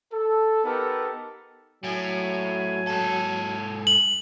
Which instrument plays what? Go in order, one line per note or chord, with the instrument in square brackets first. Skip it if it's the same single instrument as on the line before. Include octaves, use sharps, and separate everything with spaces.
[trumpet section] A4
B3 D#4 G4 A4 A#4
[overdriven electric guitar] A2 [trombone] F#3 [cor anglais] G#5
[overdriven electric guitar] G#2 A4
[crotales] F#7